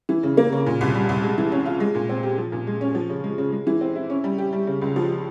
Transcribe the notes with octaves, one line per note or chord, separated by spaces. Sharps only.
E3
C#3
A#3
C#3
A#2
C2
G3
C2
G#3
E3
C#4
F4
G#3
A#2
C4
G4
F3
A#2
G#3
C#4
F3
C#3
G#3
C#3
G#3
E3
C4
E4
C#4
G3
G4
G3
C#3
C#2
F3